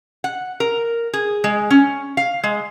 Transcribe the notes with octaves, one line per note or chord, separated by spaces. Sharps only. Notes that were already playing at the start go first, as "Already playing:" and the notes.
F#5
A#4
G#4
G#3
C#4
F5
G#3